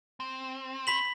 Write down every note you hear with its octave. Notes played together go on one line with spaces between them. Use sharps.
C4
B5 B6 F#7